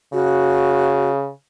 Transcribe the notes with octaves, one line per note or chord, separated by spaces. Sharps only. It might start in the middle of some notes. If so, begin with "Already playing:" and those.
C#3 F#4